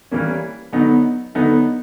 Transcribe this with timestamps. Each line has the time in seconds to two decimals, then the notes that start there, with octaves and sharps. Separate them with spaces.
0.11 E3 G3 A#3 C#4
0.72 D3 F#3 B3 D#4
1.35 D3 F#3 B3 D#4